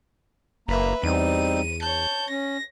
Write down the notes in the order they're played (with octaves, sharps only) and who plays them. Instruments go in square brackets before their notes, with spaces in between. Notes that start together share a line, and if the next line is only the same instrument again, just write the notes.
[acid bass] F#1 [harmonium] A#3 A#5 [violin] B4 E5
[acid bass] E2 [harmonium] G3 C4 D#4 [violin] D#7
[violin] C#5 G6 [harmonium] A5
[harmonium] C#4 [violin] A#6